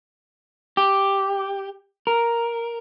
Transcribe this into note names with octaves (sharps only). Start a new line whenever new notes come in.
G4
A#4